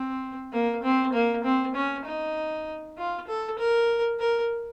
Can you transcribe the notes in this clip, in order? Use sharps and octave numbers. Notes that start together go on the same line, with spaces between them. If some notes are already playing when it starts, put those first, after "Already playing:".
Already playing: C4
A#3
C4
A#3
C4
C#4
D#4
F4
A4
A#4
A#4